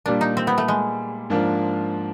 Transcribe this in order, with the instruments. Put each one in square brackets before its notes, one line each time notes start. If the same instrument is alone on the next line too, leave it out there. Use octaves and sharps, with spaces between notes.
[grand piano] A#2 G3 A#3 [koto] D4
[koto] D#4
C4
B3
A3
G#3
[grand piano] G#2 F3 A#3 D4 F4